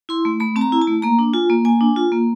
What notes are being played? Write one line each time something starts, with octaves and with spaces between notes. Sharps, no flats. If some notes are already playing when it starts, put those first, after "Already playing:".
E4 C6
A3
A3 B5
C4 A5
A#5
E4
A5
A3
A#3 A#5
D4
F4 G#5
A#3
A#3 G#5
D4
F4
A#3